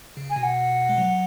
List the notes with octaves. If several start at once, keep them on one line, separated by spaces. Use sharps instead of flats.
C#3
G#5
B2
F#5
G#3
F#3